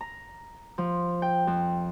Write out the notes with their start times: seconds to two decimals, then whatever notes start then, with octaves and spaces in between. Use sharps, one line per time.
0.01 A#5
0.78 F3
1.22 G5
1.47 F2